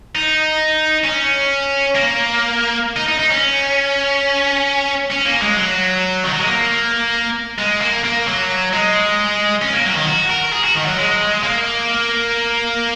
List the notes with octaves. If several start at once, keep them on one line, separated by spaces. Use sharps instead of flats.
D#4
C#4
A#3
D#4
D#4
D#4
C#4
C#4
A#3
G#3
F#3
D#3
F#3
G#3
A#3
G#3
A#3
A#3
F#3
G#3
C#4
A#3
F#3
D#3
F#4
A#4
G#4
F#4
D#3
F#3
G#3
A#3